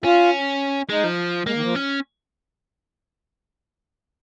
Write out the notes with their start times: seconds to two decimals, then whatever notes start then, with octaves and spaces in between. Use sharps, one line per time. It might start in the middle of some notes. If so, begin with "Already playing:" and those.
0.04 C#4 F4
0.89 G#3 D#4
1.04 F3
1.46 G#3 A#3
1.55 D#3
1.61 F3
1.75 C#4